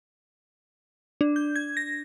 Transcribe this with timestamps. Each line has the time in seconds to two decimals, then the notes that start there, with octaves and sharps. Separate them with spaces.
1.21 D4
1.36 G6
1.56 G#6
1.77 A#6